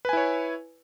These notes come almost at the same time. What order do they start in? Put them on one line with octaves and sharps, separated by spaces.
B4 G#5 E4 C#5